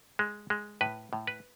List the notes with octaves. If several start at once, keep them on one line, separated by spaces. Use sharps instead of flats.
G#3
G#3
A2 B4
A2
B4